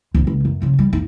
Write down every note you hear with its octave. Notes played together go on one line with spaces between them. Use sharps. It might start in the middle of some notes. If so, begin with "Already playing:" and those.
D2
C#2
F#2
C#3 F3
G3
F2 D#4